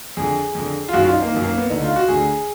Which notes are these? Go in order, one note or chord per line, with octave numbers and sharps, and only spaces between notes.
F2 D3 G#4
F2 D3
F4
F#2 D#3 F#4
F4
D#4
A#3
F#2 D#3
A#3
B3
D2 D3 D#4
F4
F#4
D2 D3 G#4